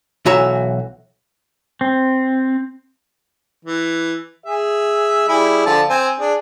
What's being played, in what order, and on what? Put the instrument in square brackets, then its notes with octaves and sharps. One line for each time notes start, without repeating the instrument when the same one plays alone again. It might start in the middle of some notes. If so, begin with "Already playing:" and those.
[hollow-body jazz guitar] B1 E3 F#4 C#5 E5 A#5
[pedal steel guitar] C4
[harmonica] E3
G#4 E5
G3 E4 G#4
D3 F3 A5
C4 G#5
D4 G#4